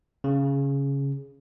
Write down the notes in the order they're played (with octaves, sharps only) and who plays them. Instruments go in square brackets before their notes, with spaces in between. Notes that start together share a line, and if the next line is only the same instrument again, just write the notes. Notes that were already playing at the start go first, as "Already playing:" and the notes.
[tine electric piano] C#3